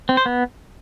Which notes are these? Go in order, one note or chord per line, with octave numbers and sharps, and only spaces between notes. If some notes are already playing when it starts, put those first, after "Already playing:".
C4
C5
B3